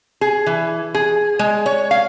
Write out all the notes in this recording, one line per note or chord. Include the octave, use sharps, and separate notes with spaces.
G#4
E3
G#4
G#3
C#5
F5